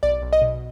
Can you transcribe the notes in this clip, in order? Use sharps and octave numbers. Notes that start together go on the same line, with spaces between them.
B1 D5
B1
D#5
B2